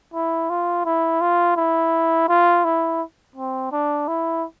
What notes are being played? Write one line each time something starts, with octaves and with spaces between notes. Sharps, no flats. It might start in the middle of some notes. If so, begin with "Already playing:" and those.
E4
F4
E4
F4
E4
F4
E4
C4
D4
E4